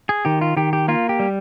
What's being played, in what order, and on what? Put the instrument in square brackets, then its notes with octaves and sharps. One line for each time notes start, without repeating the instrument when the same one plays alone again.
[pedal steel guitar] G#4
D#3 G4
F4
D#3 G4
G4
A#3 F4
G4
G3